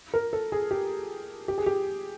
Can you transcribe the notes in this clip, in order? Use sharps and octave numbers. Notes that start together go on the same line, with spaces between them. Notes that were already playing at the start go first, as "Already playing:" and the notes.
A#4
A4
G#4
G4
G4
G#4
G4